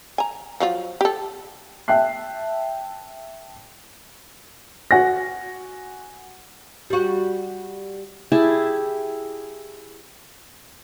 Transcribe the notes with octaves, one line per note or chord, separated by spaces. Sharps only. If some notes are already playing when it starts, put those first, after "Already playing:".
G#5 A#5
F3 F#3 F4
G4 A4
E5 G5 A5 F#6 C7
F#4 F#5 G#5 A#6
G3 F#4
E4 G4 G#4 A5